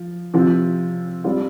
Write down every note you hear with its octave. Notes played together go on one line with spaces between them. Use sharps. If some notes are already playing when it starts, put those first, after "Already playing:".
Already playing: F3
C3 F3 C4 F4
G3 C4 F4